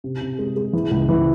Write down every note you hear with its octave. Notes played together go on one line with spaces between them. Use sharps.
C3
C3
G#3
G#3
E3
C#2
E3